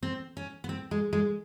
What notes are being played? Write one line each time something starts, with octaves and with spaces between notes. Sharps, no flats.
C4
C#4
B3
C4
G#3
G#3